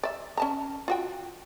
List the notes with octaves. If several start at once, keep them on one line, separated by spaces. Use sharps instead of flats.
D5 E5
C#4 A5 A#5
F4 F#4 G5